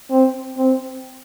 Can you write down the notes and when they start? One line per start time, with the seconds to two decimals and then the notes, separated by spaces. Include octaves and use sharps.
0.10 C4
0.57 C4